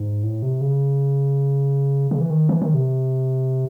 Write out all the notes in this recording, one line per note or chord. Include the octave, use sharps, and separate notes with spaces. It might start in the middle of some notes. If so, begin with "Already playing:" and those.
Already playing: G#2
A2
C3
C#3
C#3
E3
D#3
E3
D#3
C3